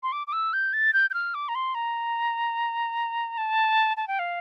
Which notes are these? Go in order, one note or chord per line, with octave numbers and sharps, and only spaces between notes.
C6
D6
D6
E6
G6
A6
G6
G6
F6
D6
A#5
C6
A#5
A5
A5
G5
F5